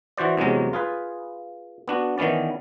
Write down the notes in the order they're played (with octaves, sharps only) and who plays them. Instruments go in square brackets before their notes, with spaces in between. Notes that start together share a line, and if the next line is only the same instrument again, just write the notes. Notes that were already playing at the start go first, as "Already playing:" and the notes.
[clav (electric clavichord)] E3 F#4 C5 D5
E2 C3 F#3 G#3 C#4
F4 G#4 B4
B3 D4 F#4
D#3 E3 B3 C#4 D5